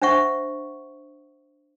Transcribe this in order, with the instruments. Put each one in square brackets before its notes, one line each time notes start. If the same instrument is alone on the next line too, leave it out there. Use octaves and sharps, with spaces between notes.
[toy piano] D4 C5 E5 F#5 C#6